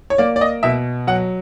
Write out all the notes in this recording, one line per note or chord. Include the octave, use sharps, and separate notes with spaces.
C#5
A#3 D5
D5
D#5
B2 E5
F#3 F#5